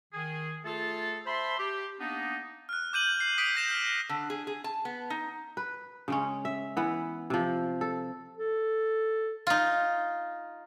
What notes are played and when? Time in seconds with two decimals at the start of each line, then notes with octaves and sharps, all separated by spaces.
0.13 D#3 G#4
0.65 A3 F4 G#4 A4
1.26 C5 E5 A5 B5 C6
1.59 G4
1.99 A#3 B3 D4 D#4
2.69 F6 F#6
2.93 D6 G6 D#7 F#7
3.20 C7
3.38 D#6 B6 D7
3.56 G6 A#6 E7
3.71 F6
4.09 D3
4.30 G#4
4.47 G#4
4.64 A5
4.85 B3
5.10 D#4
5.57 B4
6.08 C#3 G#3 C#4
6.45 E5
6.77 E3 B3
7.30 C3 F3
7.81 A4
8.37 A4
9.47 D#4 F4